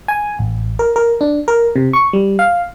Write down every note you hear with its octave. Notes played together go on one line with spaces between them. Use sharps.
G#5
A1
A#4
A#4
D4
A#4
C3
C#6
G3
F5